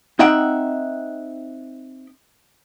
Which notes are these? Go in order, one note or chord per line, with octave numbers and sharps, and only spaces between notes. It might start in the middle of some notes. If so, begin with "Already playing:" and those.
C4 D#4 D#5 E5 F#5 G5